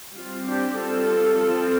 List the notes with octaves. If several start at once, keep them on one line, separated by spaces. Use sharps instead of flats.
G3 C4 F4
D4 G4
F4 A4
F3 C4